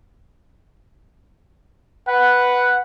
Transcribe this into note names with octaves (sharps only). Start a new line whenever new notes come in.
B4 F#5